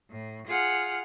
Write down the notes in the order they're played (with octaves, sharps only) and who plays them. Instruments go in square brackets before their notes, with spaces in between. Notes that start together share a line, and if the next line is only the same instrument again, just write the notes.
[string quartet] A2
F4 G#4 F#5 F6